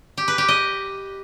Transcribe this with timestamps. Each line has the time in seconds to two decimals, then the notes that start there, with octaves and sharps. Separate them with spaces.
0.17 G4
0.28 B4
0.38 G4
0.48 D#5